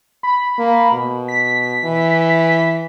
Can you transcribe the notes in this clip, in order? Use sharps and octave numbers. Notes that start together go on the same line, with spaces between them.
B5
A#3
B2
B6
E3